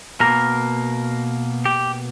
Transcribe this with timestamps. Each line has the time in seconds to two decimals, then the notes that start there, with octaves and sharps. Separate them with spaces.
0.20 B2 A#3 A#4
1.65 G4